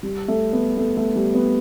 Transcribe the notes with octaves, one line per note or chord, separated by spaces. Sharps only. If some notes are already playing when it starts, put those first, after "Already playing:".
G3
A3
B3
A3
A3
G3
B3